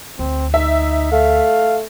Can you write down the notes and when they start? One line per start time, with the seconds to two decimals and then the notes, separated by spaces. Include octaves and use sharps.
0.19 D2 C4
0.54 D#4 E5
1.12 A3 F5